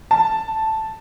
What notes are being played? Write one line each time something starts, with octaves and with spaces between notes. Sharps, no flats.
A5